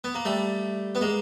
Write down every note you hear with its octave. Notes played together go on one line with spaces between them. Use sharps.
B3
A#3
G3 A3
B3
G#3 A#3